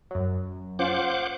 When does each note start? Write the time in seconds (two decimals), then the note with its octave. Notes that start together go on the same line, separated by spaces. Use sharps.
0.11 F#2 F#3
0.79 C#4 F4 C5 F#5 D6